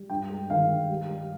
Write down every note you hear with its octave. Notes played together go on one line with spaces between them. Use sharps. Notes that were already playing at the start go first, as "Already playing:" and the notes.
Already playing: G3
G2 G5
G#3
D#3 F5
G2
G3
G3